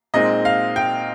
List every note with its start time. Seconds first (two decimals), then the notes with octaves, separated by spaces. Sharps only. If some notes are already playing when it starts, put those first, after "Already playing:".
0.14 A#2 G#3 C4 D#4 D#5
0.45 F5
0.76 G5